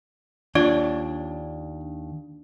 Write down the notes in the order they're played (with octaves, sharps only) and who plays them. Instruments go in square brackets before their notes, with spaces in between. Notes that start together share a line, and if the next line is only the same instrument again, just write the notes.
[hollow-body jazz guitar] D#2 C#5 [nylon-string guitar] D4 [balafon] F4 [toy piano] D5